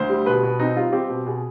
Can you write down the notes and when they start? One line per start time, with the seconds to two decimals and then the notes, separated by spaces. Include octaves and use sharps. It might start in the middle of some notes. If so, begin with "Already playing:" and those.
Already playing: D2 C5
0.10 G3
0.26 B2 B4
0.43 B2
0.59 C4 D#4
0.76 G3 F4
0.92 C4 G4
1.09 B2
1.26 B2 G#4